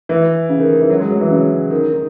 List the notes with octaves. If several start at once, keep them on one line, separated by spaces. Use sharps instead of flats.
E3
C#3
D#3
D#3
E3
F#3
G#3
F#3
E3
C#3
D#3
D#3